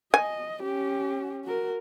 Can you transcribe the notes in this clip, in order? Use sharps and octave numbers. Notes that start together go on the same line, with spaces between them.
D#5 G#5
C#4 G4
F#4 A#4